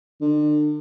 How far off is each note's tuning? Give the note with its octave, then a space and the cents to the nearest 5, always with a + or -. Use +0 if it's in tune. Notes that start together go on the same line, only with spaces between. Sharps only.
D3 +35